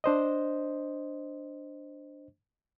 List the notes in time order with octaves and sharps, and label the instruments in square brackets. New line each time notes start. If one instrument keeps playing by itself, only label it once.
[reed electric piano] D4 C5 D#5